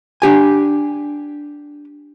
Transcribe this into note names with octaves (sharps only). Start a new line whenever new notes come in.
D4 G4 G#5